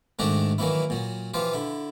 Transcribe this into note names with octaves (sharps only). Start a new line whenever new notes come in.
G#2 D#3 A3 D4 F#4 G4
D#3 E3 F#3 A#3 E4
A#2 F#3
E3 F3 F4 G4
D3 E4